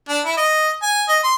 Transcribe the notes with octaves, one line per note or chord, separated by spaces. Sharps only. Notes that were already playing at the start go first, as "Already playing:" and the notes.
D4
E4
D#5
G#5
D#5
C6